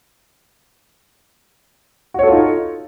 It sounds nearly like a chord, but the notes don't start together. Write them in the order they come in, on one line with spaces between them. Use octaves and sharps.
F#4 C#5 A4 F4 D#4